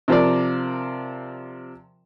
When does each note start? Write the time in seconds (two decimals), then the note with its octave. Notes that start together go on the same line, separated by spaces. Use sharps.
0.08 C3 F3 A#4 D5